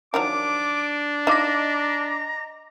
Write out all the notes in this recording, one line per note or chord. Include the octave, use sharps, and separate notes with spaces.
D#3 F3 F#3 D4 D6
D#4 F4 D#5 A#5 D6 A#6